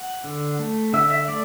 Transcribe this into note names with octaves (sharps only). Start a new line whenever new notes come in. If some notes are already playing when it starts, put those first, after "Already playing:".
Already playing: F#5
D3
A3
D3 E5
E5
A3 D5